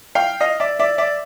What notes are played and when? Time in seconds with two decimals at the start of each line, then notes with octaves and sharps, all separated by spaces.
0.15 F5 G5
0.41 D#5 F5
0.60 D5 E5
0.79 D5 E5
0.98 D5 E5